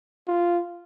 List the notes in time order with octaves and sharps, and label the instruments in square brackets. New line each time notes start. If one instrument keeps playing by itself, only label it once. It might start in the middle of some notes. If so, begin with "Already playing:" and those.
[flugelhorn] F4